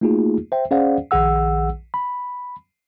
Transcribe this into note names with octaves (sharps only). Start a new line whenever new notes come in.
A3 A#3 D#4 F4 F#4 G#4
C5 E5 G5
C#4 G#4 C5 D5 F5 F#5
A#1 D#3 G#4 F#5 E6
B5